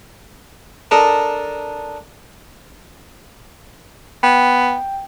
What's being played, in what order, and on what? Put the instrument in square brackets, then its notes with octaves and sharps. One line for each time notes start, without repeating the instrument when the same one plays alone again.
[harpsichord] D4 A4 A#4 D#5
[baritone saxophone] B3 [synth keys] G5